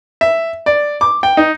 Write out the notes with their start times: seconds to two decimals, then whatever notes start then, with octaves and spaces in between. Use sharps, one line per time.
0.21 E5
0.66 D5
1.01 D6
1.23 G5
1.37 D#4